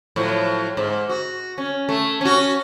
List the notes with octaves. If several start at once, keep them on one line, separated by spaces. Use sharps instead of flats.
A2 F3 F#3
G#2
F#4
C#4
A3
C#4 F#4